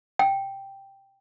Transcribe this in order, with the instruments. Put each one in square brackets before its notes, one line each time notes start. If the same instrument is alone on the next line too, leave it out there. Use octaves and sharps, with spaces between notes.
[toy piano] G5